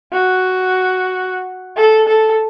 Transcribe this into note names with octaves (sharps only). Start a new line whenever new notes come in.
F#4
A4
A4